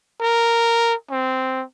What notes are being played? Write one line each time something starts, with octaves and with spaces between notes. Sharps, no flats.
A#4
C4